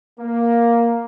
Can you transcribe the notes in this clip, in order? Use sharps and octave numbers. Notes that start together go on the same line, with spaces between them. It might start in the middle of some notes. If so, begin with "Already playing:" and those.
A#3